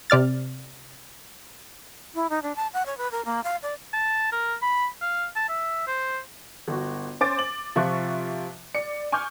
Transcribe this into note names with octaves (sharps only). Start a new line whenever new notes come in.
C3 D5 F6 A6
E4
D#4
D4
A5
F#5
C#5
B4
A#4
A#3
F5
D5
A5
A#4
B5
F5
A5
E5
C5
G1 F#4
C#4 C5 G#5 D6 A6 D7
F#7
C3 F3 F4 E5 C#6 F#6
D5 C#7
G#5 C#6 D6 F6 G6